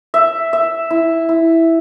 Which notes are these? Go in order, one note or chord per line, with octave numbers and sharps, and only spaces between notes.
E5
E5
E4
E4